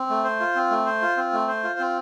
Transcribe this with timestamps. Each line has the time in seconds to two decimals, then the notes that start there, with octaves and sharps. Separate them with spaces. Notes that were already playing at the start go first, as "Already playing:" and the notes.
Already playing: C4
0.10 A3
0.24 C5
0.40 F4
0.55 C4
0.71 A3
0.86 C5
1.02 F4
1.17 C4
1.33 A3
1.48 C5
1.63 F4
1.79 C4